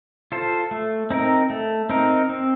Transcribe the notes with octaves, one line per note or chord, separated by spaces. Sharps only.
F4 A4 C5
A3
C4 D#4 A#4
A3
C4 D#4 A#4
C4